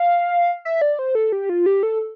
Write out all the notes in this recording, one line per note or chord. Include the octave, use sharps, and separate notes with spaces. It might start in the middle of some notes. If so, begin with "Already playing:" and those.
Already playing: F5
E5
D5
C5
A4
G4
F4
G4
A4